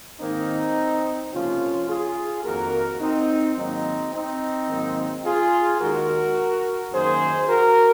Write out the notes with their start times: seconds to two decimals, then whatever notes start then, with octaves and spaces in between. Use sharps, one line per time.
0.20 G#2 D#3 A#3 C4 D#4
1.32 C#2 C3 F3 A#3 C#4 F4
1.89 F4 G#4
2.44 F2 D#3 A#3 F#4 A#4
3.00 C4 D#4
3.56 G#2 D#3 F#3 A#3 C4 D#4
4.13 C4 D#4
4.68 G#2 D#3 F#3 A#3
5.24 F4 G#4
5.80 D#2 D#3 G#3 F#4 A#4
6.92 F#2 D#3 A#3 G#4 C5
7.48 F#4 A#4